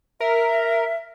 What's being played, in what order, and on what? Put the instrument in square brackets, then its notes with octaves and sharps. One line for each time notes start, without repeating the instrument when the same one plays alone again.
[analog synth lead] A#4 [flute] E5